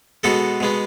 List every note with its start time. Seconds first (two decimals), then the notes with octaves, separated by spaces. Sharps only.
0.23 B2 G#3 B3 F#4 A4
0.60 B2 G#3 B3